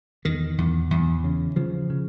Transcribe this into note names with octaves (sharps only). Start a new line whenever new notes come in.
E2 D#3
E2
E2
C#3
C#3 F3
C#3